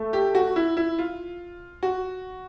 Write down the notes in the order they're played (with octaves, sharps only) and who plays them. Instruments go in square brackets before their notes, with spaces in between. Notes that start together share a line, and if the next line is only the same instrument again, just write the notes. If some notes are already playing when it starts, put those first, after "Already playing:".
Already playing: [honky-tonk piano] A3
[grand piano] G4
F#4
E4
E4
F4
F#4